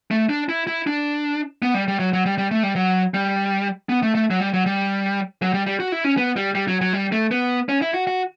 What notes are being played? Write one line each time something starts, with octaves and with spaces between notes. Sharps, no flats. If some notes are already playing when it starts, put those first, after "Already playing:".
A3
D4
E4
E4
D4
B3
G3
G3
F#3
F#3
G3
G3
A3
G3
F#3
G3
B3
A3
A3
F#3
G3
F#3
G3
F#3
G3
G3
F#4
E4
C#4
B3
G3
G3
F#3
F#3
G3
A3
B3
C#4
E4
F#4
F#4